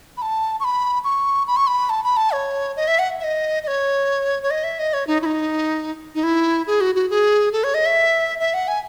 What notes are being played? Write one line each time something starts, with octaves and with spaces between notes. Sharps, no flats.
B5
A5
C#6
B5
C#6
B5
C#6
B5
A5
B5
A5
C#5
D#5
E5
F#5
E5
D#5
D#5
C#5
C#5
D#5
E5
D#5
C#5
D#4
E4
D#4
D#4
E4
G#4
F#4
F#4
G#4
A4
C#5
D#5
E5
E5
F#5
G#5